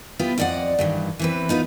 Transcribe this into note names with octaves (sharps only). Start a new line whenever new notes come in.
B3 E4 F4 G4
F2 F3 D5 D#5 F#5
G2 D#3 E3
E3 C4 B4
B3 D#4 F4 B4